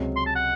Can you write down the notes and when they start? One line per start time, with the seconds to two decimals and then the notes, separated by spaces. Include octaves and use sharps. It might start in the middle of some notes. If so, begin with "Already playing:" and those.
Already playing: C#2 C3 F#3
0.16 C6
0.26 A5
0.35 F#5